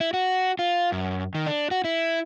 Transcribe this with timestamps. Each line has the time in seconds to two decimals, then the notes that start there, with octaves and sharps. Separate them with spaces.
0.01 E4
0.14 F#4
0.59 F4
0.92 F#2
1.35 D#3
1.47 D4
1.71 F#4
1.84 E4